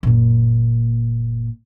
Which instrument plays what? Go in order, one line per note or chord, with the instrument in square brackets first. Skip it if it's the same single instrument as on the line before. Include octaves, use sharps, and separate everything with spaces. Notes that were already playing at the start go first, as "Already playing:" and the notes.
[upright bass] F#1 A#2